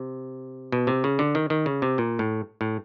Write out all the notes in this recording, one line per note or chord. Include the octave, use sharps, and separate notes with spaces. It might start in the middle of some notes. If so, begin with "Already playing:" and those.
Already playing: C3
B2
C3
C#3
D3
D#3
D#3
C#3
C3
A#2
A2
A2